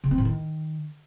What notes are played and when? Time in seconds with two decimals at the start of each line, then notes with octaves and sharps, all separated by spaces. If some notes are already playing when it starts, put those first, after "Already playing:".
0.04 C#3
0.11 C4
0.18 A2
0.25 D#3